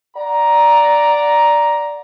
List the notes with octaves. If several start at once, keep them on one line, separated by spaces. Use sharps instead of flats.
D5 F#5 A#5